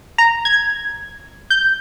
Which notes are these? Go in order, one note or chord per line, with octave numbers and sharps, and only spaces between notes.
A#5
G#6
G6